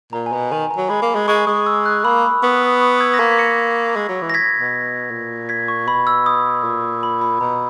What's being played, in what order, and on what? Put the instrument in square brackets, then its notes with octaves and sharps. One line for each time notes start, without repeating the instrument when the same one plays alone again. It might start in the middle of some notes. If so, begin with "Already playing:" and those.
[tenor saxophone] A#2 [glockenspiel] A#5
[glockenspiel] G#5
[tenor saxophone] B2 [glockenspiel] A#5
[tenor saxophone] D#3 [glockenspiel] G#5
[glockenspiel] A#5
[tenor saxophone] F#3
[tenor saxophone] G#3 [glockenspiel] B5
[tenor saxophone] A#3
G#3
[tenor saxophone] G#3 [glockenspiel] C#6
[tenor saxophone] G#3 [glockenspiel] D#6
[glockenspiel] E6
F#6
[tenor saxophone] A#3 [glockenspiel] B5
[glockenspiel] B5
[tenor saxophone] B3 [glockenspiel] C#6
[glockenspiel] D#6
C#6
E6 G#6
A#6
[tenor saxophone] A#3 [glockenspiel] G#6 B6
[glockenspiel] B6
A#6 C#7
[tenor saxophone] G#3
F#3
E3
[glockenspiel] A#6
G#6 B6
[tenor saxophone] B2
A#2
[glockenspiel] G#6 B6
C#6
[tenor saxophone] B2 [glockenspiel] B5
[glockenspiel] E6
D#6
[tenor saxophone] A#2
[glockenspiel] B5
B5
[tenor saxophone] B2 [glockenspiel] A#5